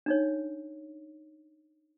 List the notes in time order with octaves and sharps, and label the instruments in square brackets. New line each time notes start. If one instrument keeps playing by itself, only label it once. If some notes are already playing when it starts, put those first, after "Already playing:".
[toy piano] D4 D#4 C#5